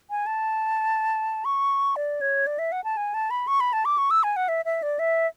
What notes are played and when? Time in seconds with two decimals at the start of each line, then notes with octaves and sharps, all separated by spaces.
0.10 G#5
0.26 A5
1.45 C#6
1.96 D5
2.21 C#5
2.47 D5
2.59 E5
2.72 F#5
2.84 A5
2.97 G#5
3.14 A5
3.31 B5
3.47 C#6
3.60 B5
3.73 A5
3.85 D6
3.98 C#6
4.11 E6
4.23 G#5
4.36 F#5
4.48 E5
4.65 E5
4.83 D5
4.99 E5